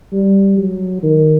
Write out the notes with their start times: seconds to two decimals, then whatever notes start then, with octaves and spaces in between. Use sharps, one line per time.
0.12 G3
0.58 F#3
1.03 D#3